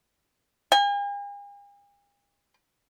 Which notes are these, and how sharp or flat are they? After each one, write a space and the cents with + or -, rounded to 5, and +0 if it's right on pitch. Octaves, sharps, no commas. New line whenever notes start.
G#5 -45